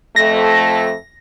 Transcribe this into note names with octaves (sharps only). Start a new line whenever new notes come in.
F2 A3 A#6